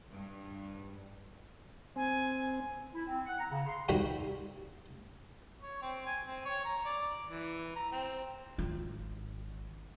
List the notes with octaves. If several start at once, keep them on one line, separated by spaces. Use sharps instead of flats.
G2
C4 G#5
E4
C4
F#5
A#5
C#3
C6
C3 D#3 G3 D4 F#4
C#5
C4
G#5
C4
C#5
A#5
D5
E3
A#5
C4
G#1 F4